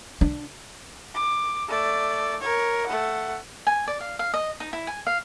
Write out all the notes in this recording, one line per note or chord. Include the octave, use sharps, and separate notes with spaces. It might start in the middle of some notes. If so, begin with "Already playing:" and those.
D4
D6
A3 D5
A#4 C#5
A3 F#5
G#5
D5
F5
F5
D#5
D#4
E4
G#5
F5